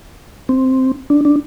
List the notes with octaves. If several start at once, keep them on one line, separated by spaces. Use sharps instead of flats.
C4
D4
D4